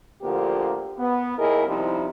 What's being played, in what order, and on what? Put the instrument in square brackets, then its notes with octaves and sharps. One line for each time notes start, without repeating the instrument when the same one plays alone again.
[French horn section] D2 D3 F3 A#3 G4
B3
D#2 E4 G#4 A#4 D#5
C3 F3 G3 D#4 E4